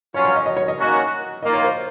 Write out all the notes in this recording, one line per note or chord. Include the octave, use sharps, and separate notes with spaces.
F#3 C#4 F4 C#5
C#5
D#5
D#5
C#5
D#5
D#3 A#3 C#4 F#4
D#3 A#3 F4 D#5
C#5
C5